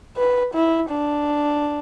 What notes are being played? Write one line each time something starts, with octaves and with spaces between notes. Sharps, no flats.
B4
E4
D4